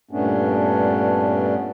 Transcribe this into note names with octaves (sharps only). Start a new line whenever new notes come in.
G2 A#2 A3 B3 C#4 D4